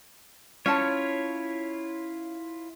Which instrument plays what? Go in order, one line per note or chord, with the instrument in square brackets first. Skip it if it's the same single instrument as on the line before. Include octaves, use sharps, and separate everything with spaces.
[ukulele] C#4 A5 [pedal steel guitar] E4 F4 C#5